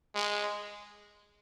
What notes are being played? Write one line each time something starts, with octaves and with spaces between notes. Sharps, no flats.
G#3